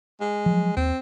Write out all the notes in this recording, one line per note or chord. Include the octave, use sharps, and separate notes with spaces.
G#3
F3 F#3
D#2 C4